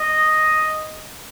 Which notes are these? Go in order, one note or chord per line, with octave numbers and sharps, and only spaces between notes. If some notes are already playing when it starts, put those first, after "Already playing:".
Already playing: D#5